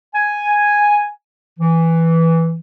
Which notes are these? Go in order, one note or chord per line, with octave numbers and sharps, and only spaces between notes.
G#5
E3